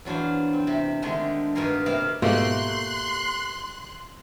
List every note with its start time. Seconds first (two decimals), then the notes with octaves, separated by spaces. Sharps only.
0.05 E2 F#3 D4 C5 F5
0.53 C4
0.67 C3
1.02 D3 D#3 G#3 A3 D4
1.55 G2 B2 D#4 G#4 A#4 F5
1.86 C3 A#3 A#4 F5 B5
2.22 G#2 B2 A3 A#3 F4 G4 C6 F#6